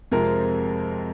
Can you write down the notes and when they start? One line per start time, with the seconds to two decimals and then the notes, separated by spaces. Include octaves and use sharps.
0.12 F2 C3 F3 G#3 C4 A#4